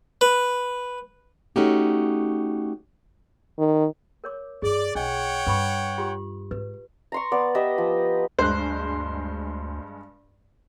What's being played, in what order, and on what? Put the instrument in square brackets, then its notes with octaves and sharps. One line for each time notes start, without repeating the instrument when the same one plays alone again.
[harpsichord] B4
[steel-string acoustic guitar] A3 C#4 D#4 F#4 G4
[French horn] D#3
[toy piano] A#4 C#5 D6
[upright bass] G2 A#3 [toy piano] G#4 [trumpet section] D5
[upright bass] B1 [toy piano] D4 D#5 [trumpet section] C#5 F#5 G5
[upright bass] G2 [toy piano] B4 B5 C#6
[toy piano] F4 G4 C6
[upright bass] G#2 [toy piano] B4
[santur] A#5 C6 C#6
B3 D5
G4 B4 D#5 E5
F3
[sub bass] D2 [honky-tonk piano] G2 G#3 [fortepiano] C5 F#6